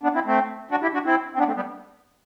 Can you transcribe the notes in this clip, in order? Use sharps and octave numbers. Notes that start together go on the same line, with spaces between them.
B3 D4
C4 E4
A3 C4
D4 F#4
E4 G4
D4 F#4
C4 E4
C4
B3 D4
A3 C4
G3 B3